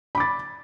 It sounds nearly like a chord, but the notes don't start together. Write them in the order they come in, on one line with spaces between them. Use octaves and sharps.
B5 D6 A6